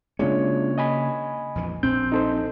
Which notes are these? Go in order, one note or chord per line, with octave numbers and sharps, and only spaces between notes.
C#3 G#3 A#3 C#4 D4 F4 C#5
D#5 G#5 B5
A#1 F2 E3
A#1 C4 G6
D#4 A4 C5